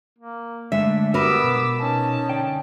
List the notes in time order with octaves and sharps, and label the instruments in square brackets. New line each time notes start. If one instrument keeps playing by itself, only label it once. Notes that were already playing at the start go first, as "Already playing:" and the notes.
[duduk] A#3
[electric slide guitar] D3 G#3 A3 [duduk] D4 [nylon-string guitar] E5
[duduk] B3 [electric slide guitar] F#4 G4 [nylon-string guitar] A#4 B4 [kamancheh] D6 E6
[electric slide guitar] B2
[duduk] C#4 [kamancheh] D#4 A5
[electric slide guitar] D3 D5 G5